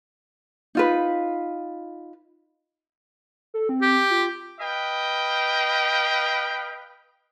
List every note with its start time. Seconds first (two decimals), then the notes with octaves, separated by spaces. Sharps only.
0.75 D#4 F4 B4
3.54 A4
3.69 C4
3.82 G4
4.11 F4
4.60 B4 D#5 F5 G5